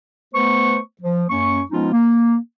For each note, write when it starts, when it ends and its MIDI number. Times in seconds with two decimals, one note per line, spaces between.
0.34 0.77 57
0.34 0.77 59
0.34 0.77 71
0.34 0.77 72
0.34 0.77 85
1.02 1.24 53
1.29 1.61 42
1.29 1.61 58
1.29 1.61 61
1.29 1.61 85
1.71 1.92 53
1.71 1.92 56
1.71 1.92 59
1.71 1.92 61
1.71 1.92 63
1.71 1.92 65
1.92 2.36 58